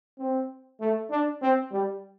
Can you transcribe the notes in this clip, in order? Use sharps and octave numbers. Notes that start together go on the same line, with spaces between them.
C4
A3
D4
C4
G3